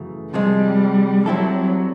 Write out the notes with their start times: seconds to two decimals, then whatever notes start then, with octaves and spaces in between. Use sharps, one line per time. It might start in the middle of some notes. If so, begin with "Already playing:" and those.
Already playing: F#2 C#3 E3 A3
0.33 C3 F3 G3 G#3
1.26 F#3 G3 C4 E4 A4